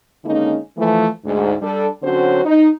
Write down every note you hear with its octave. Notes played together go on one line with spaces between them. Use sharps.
D3 D#3 G#3 A#3 C#4 D#4
E3 F3 A3
D2 G#2
G3 D4 A4
D3 F#3 C4 C#4 F#4 C5
D#4